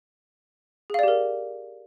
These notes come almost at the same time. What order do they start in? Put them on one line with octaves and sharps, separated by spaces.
G#4 F5 D5 G4 A#4